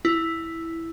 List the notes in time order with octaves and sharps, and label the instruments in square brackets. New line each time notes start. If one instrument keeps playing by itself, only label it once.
[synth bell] E4